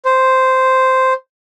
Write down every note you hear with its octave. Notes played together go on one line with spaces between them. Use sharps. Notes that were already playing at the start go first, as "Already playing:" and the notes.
C5